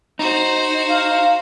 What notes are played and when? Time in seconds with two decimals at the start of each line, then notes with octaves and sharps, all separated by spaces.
0.19 D#4 F#4 C5
0.89 F5